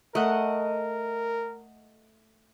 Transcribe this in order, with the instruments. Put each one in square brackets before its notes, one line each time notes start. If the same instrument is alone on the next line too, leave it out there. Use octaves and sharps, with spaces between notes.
[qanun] A3 [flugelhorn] A#4 [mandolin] D#5 F#5